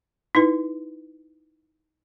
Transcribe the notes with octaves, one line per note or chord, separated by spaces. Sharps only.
D#4 E4 B4